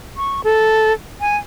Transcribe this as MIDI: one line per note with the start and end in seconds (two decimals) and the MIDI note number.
0.17 0.44 85
0.44 0.93 69
1.21 1.37 80